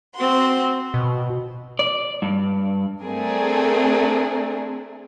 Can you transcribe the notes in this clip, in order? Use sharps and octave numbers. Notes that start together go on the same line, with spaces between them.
C4 F#4 C6
B2
D5
G2
A3 C4 D4 G#4 A#4